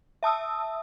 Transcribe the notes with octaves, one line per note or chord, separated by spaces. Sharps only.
E5 A5 D#6 E6